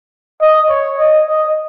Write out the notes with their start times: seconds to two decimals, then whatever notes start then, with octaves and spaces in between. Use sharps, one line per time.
0.41 D#5
0.69 C#5
0.98 D#5
1.26 D#5